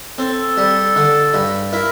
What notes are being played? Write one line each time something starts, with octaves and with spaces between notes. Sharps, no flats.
C4 A4
G3
D3
G2
E4 A#4